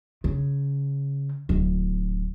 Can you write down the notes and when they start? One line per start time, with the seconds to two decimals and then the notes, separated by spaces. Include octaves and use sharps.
0.24 C#3
1.49 D1